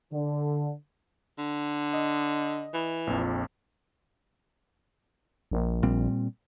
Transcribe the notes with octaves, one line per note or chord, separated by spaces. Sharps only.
D3
D3
D#5
E3
A#1 F2
A#1
A#2 G3 C4